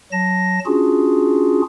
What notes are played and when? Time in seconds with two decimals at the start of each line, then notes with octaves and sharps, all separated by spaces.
0.12 F#3 A5 A#6
0.66 C#4 D4 F4 F#4 G#4